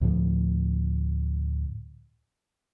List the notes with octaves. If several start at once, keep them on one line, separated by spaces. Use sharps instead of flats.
D2 A2 F3